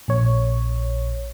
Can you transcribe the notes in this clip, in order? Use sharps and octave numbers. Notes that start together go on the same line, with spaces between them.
A#1 C#5